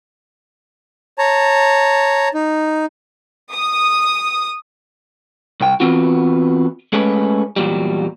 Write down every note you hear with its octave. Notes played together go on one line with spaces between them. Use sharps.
C#5 A5 A#5
D#4
D#6
C2 G5
E3 B3 C4 F4 F#4
G#3 A3 C#4 B4
E2 A#2 F#3 G3